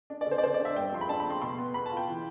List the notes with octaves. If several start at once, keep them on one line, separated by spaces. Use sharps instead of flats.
D4
D5
D3
C5
D5
D3 C5
D5
D4
E5
G2 G5
F3 C6
B5
D4 A5
B5
A3
C6
B2 C6
B3
B3 B5
A5
F4
G5
E3